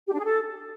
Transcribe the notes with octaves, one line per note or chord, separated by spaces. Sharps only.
G4
D4
G#4
A4